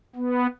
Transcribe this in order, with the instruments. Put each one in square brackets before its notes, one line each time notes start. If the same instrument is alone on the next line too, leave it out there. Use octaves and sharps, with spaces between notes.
[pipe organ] B3